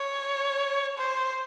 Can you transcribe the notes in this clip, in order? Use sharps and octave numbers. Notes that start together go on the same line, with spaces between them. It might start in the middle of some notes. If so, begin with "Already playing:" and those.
Already playing: C#5
C5